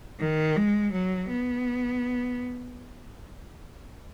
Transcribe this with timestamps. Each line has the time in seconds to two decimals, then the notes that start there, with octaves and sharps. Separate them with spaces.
0.20 D#3
0.56 G#3
0.92 F#3
1.29 B3